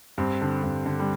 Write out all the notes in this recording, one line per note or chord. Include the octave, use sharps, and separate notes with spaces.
G2 C4
D3
G2
D3
G3